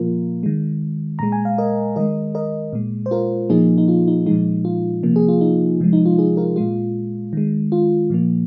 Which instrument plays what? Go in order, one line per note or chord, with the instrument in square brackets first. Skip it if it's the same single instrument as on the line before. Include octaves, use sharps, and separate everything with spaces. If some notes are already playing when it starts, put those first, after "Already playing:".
Already playing: [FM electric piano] A#2 F3 A#3 F4 A#4
D#3 G#3
A#2 G#3 A#5
G#5
F5
A#4 D#5
D#3 G#3 A#4 D#5
A#4 D#5
A#2 G#3
C5
F4 A#4
A#2 F3 A#3 D#4 G#4
D#4
F4
D#4
A#2 F3 G#3 D#4
F4
C3 F3 A#3
G#4
F4
D#4
C3 F3 G#3
D#4
F4
D#4 G#4
F4 A#4
A#2 G#3 F4
D#3 G#3
F4
A#2 F3 A#3